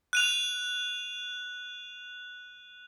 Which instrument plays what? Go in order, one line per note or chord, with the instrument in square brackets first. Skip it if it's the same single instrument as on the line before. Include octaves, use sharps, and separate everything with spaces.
[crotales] F#6 D#7 F7